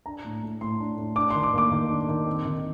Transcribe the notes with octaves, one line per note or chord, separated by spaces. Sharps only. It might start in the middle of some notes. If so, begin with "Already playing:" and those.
D4 A#5
A2
A3
A2 C6
D4
A2
D4 D6
D#3 C6
D6
A#3 D6
D#3
D4
D#3
C4
D#3